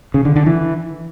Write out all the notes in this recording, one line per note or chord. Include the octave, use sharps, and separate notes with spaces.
C#3
D3
D3
E3